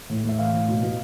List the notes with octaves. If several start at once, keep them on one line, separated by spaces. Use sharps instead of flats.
A2
A2 E5
E3 F5
A2
B2
B2